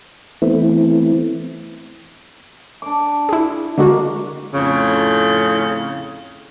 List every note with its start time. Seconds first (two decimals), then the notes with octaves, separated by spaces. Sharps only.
0.42 E3 A3 B3 C4 E4
2.82 D4 D6
3.29 E4 G#4
3.78 D3 G#3 A#3 F#4
4.54 F2 A2 C#3